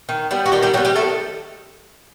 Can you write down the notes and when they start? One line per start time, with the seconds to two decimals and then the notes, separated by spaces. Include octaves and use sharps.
0.09 D#3
0.31 G3 B3
0.46 F#4
0.52 D#3 G3 G4
0.63 G3 G4
0.74 F#3 G3 F#4
0.77 B3
0.85 G3 G4
0.96 D#3 A3 A4